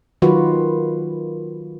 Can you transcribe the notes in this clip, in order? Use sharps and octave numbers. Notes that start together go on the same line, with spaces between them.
D#3 F#3 F4 F#4 B4